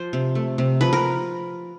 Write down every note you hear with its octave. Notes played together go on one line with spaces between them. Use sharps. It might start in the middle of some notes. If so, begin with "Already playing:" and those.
Already playing: F3 C5
C3
A3
C3
F3 B4
A#4